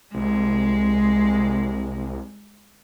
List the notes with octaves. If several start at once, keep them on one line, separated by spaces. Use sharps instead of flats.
C2 G#3